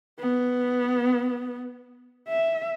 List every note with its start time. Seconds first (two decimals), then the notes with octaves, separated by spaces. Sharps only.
0.20 B3
2.28 E5